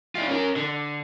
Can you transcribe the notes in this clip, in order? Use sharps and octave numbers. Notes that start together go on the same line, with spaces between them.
D#4 F4
C#4 A#4
D3